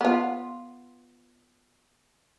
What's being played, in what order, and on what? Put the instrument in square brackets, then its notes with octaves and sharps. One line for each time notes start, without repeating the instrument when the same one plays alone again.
[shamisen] B3 F4